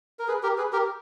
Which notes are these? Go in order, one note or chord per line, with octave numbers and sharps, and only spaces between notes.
A#4
G#4 B4
G4 A#4
G#4 B4
G4 A#4